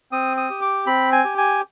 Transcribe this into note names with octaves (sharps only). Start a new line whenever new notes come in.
C4 D#6
D#6
G4
D6
C4 B5
G#5
G4
G#5